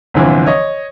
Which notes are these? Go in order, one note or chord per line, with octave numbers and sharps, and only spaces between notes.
G1 C2 D3 E3 F3
C#5 D#5